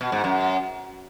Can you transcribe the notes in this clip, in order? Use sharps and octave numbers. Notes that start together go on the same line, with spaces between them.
B2
G#2
F#2